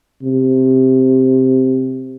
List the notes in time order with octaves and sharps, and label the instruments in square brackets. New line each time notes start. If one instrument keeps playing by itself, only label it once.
[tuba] C3